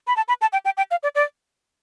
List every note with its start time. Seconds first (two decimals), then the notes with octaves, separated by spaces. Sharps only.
0.07 B5
0.17 A5
0.28 B5
0.41 A5
0.53 G5
0.65 G5
0.77 G5
0.91 F5
1.03 D5
1.15 D5